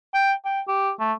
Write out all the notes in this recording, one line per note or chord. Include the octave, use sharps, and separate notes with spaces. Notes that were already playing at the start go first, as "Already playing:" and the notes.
G5
G5
G4
A3